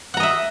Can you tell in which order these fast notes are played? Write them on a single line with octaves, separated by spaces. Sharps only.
F#5 A#5 D#5 E5